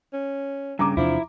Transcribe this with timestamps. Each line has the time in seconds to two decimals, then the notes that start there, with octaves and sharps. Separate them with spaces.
0.13 C#4
0.79 G2 C#3 A#5 D6
0.97 E2 C3 F3 D4 E4